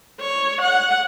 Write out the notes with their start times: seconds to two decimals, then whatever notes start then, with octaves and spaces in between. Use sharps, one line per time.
0.20 C#5
0.61 F#5